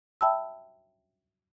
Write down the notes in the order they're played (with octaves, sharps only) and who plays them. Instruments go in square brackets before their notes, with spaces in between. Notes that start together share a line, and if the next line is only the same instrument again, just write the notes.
[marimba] E5 G5 A5 B5 E6